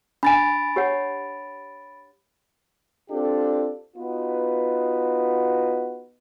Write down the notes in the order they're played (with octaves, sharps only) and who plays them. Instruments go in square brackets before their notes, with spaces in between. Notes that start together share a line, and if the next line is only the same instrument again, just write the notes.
[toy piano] D4 G#5 [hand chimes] B5 A6 D7
[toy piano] G4 C#5 F#5
[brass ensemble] C4 D4 F4 G4 A4
[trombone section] B3 D#4 F4 F#4 B4